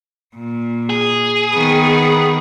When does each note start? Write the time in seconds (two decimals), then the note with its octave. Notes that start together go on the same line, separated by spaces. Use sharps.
0.36 A#2
0.90 G#4
1.52 D#3 B3